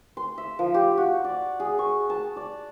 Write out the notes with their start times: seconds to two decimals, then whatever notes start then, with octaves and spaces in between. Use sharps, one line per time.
0.17 C6
0.38 E5
0.59 F3
0.74 G4
0.98 F#4
1.24 D5
1.60 G#4
1.79 C#6
2.10 A5
2.36 D5